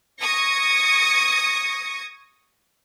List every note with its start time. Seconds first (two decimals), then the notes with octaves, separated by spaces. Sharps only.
0.20 C#6 D#6 G#6 A#6 C#7